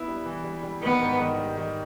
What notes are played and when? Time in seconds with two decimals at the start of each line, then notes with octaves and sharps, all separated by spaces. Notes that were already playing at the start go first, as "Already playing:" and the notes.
Already playing: B3 E4
0.08 G3
0.26 E3
0.44 G3
0.63 G3
0.82 D#3 B3
1.01 G#2
1.20 D#3
1.38 G3
1.57 D#3